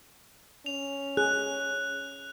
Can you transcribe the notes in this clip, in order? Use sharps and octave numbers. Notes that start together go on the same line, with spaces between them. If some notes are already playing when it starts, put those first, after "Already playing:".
C#4 F7
G#4 F#6